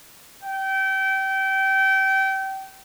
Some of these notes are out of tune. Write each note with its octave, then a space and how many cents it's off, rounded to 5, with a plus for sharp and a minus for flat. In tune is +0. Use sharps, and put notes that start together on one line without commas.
G5 -25